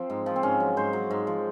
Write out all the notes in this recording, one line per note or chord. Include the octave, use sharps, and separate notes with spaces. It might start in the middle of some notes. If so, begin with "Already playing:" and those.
Already playing: F3 C4
G#2
F3
C4
G#2 C#4
F#3
G#2 C5
F#3
G#2
F3